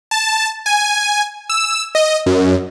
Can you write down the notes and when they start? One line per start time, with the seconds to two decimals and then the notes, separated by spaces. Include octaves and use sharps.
0.11 A5
0.66 G#5
1.49 E6
1.95 D#5
2.26 F#2